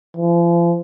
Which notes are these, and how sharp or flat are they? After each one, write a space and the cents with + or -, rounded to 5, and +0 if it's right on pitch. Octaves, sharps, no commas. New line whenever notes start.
F3 -40